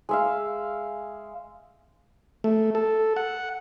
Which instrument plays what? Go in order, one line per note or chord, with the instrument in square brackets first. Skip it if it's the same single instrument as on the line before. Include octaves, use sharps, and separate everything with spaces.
[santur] G#3 E5 F5
[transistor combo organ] A3
A4
F#5